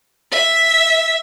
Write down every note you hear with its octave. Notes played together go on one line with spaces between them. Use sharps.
E5